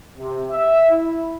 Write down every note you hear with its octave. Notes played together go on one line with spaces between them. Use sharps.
C3
E5
E4